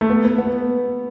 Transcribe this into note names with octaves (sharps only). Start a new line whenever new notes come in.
A3
B3
B3
B3